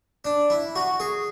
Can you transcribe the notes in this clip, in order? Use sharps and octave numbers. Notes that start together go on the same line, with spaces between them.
D4
E4
F#4
G#4